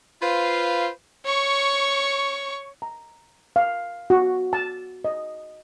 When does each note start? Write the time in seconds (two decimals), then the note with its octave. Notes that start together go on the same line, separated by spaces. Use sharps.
0.22 F4 B4 C5 F5
1.25 C#5 C#6
2.82 A#5
3.56 F5
4.10 F#4
4.53 A5
5.05 D#5